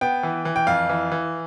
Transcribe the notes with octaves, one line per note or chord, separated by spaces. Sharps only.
B3 G5
E3
E3
G5
F2 F5
E3
E3